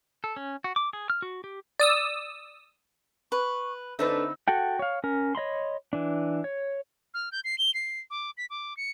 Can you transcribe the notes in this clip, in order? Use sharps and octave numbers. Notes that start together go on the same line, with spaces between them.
A4
C#4
F#4
D6
G#4
F6
F#4
G4
D5 D#6 E6
B4 C#6
D3 A3 C4 D4 D#4 B4 E6
F#4 A4 F#5 G5
C#5 F5
C#4 A#4
C#5 D#5 B5 C6
E3 D4
C#5
F6
G6
C7
G7
C7
D6
B6
D6
C#7